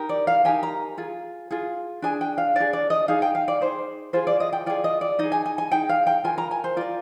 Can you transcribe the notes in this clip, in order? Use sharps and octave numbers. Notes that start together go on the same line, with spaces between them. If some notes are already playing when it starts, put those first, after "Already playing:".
Already playing: D#4 G4 A#4
D5
F5
D#4 G4 A#4 G#5
A#5
F4 G#4
F4 G#4
D4 G#4 G#5
G5
F5
D4 G#4 D5
D5
D#5
D#4 G#4 F5
G5
F5
D5
D#4 G#4 C5
F4 G#4 C5
D5
D#5
G5
F4 G#4 D5
D#5
D5
D#4 G#4 D#5
G#5
G#5
G#5
D#4 G#4 G5
F5
G5
F4 A#4 G#5
A#5
G#5
C5
F4 A#4 D5